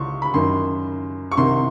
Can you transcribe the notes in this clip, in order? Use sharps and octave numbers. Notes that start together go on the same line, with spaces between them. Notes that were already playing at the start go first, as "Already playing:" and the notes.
Already playing: C#2 C6 C#6
B5
F#2 D#3 C6
C#6
C2 C3 D#3 C6